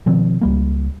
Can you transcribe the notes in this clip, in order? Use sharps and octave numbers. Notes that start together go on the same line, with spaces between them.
B2 D#3 F3 C4
C#2 G3 A#3